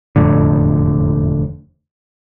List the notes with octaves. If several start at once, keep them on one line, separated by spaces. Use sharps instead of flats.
E1 F2 A2 D3